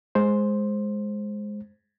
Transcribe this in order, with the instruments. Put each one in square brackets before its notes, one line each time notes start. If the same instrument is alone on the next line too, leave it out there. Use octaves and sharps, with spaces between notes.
[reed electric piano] G#3 C5